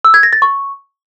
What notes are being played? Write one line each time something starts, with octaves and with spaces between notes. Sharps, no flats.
E6
G#6
A#6
A6
C#6